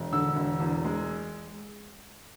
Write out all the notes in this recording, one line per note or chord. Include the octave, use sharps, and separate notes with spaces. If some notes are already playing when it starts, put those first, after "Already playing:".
Already playing: E1
D3 E6
E1
E2
G#3